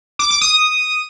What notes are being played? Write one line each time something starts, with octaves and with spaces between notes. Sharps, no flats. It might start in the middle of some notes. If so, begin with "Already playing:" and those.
D6
D6
D#6